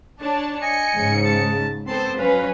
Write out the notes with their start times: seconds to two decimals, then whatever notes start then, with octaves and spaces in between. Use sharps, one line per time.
0.20 D4 C#5 A5
0.62 D#5 G#5 C#7
0.94 G#2 C#3
1.25 A5
1.87 B3 C4 A4 C5 A5 C6
2.18 F#3 C#4 B4 F5